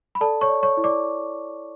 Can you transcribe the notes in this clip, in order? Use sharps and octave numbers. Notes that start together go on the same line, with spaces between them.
B5
A4 D5 A5
C#5 C#6
D5
C#5 C#6
E4
D5 D6